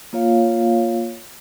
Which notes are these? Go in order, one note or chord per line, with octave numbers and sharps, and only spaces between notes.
A#3 F4 C#5 F5